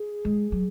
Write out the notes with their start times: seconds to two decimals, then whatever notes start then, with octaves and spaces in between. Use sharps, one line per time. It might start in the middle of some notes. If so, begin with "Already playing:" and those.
Already playing: G#4
0.25 G#3
0.52 F#3